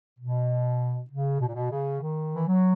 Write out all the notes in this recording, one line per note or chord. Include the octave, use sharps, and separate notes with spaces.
B2
C#3
B2
A#2
B2
C#3
D#3
E3
F#3